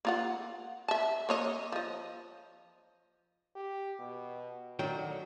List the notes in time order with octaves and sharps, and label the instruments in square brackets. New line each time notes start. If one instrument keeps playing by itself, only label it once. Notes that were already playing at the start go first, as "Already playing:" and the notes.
[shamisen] A#3 F4 F#5
E5 A5
A#3 C#5 D#5
F3 D#5
[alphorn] G4
B2
[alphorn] D3 [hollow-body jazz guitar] D#3 F#3 G5